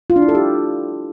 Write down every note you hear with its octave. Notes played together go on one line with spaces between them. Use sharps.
F4
D4
E4
A4
G4